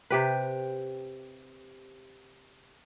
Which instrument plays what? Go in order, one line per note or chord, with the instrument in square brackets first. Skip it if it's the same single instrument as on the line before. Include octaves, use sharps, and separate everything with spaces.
[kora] C3 G4 B4